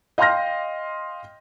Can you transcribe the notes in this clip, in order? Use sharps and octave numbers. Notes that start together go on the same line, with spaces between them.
D#5 F5 G5 C6 F6 A#6